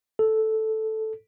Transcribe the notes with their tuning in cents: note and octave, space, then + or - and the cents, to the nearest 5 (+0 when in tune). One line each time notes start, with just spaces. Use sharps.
A4 -5